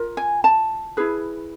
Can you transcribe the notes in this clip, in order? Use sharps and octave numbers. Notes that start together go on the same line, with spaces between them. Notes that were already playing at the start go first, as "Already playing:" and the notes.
Already playing: F4 A#4
G#5
A5
E4 G#4 B4